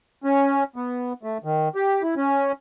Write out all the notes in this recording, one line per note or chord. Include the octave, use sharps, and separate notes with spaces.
C#4
B3
A3
D#3
G4
E4
C#4